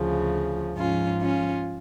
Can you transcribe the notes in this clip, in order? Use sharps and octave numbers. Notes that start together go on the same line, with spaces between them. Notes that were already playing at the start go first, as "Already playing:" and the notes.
Already playing: D2 C#3 F3
G#2 F3 C#4 F4
C#4 F4